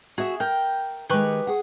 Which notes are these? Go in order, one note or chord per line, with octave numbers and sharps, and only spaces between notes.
F#4 G#4 E5
A#4 G5
D#3 G#3 G4 B4 C#6
G#4 F#5